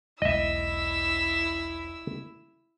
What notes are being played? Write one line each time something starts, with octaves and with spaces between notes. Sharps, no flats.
E1 B1 E4 D#5 E5 E6